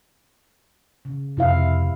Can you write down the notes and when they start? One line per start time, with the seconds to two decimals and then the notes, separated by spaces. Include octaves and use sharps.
1.05 C#3
1.37 F2 C3 E4 F5